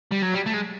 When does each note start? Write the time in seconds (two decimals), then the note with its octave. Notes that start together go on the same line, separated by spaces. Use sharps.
0.11 G3
0.22 F#3
0.34 G3
0.46 A3
0.53 G#3